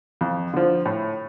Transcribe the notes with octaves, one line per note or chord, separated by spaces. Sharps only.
F2
D3 F3
A2